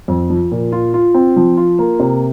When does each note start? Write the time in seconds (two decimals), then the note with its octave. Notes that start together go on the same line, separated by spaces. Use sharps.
0.08 F2
0.30 F3
0.52 A#2
0.72 F4
0.94 F4
1.14 C4
1.36 F3
1.57 F4
1.79 A#3
2.00 C3